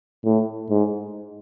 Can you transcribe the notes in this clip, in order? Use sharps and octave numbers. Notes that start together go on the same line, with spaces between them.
A2
G#2